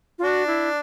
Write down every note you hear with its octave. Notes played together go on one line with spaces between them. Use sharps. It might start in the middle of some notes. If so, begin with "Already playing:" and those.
F4
D4 F#4
E4